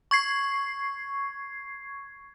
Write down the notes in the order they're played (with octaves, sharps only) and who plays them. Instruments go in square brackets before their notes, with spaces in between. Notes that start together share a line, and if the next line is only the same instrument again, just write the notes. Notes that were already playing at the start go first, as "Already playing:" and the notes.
[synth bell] C#6 G#6 C7